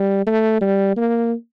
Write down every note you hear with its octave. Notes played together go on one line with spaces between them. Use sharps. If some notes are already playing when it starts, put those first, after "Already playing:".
Already playing: G3
A3
G3
A#3